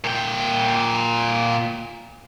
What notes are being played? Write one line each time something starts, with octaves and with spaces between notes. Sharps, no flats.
A#2 G5